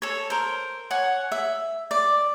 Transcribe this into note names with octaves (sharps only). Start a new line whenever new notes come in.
A4 C#5
A#4 C5
C#5 F#5 G#5
E5
D5